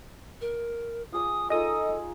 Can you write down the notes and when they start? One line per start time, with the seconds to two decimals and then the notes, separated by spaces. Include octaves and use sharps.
0.41 A#4
1.12 F4 G#4 D6 D#6
1.50 D#4 F4 G#4 A4 D#5 D#6